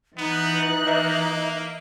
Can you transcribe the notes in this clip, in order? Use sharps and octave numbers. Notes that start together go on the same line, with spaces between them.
E3 B3 D#4 F#6
A#3 D#5 E5